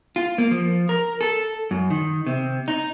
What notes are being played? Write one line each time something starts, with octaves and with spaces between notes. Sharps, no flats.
F4
A#3
F3
A#4
A4
F#2
D#3
C3
D#4